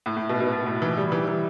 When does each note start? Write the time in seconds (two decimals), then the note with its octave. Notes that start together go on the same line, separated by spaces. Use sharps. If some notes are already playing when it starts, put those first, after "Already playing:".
0.06 A2
0.17 A2
0.29 B2
0.40 B2
0.51 B2
0.66 A2
0.82 E3
0.97 G3
1.12 E3
1.28 E3